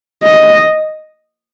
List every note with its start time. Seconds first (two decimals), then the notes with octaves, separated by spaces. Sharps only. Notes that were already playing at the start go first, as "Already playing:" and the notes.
0.23 D#5